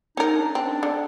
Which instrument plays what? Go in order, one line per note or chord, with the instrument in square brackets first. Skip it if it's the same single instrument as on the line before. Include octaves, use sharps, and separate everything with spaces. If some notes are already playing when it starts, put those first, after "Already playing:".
[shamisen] C#4 A#4 [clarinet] D#4
[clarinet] D4
[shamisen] C4 [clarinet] D4
[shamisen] D3